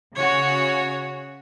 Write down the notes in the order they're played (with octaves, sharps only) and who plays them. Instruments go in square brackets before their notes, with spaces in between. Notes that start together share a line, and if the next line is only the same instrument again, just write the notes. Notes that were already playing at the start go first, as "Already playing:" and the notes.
[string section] C#3 F#4 [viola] C#5